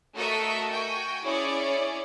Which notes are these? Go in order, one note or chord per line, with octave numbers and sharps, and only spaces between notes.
A3 F#4 A4 A#4 D#5 E5
F#4 G5 G#5
C#4 E4 G#4 C#5 D5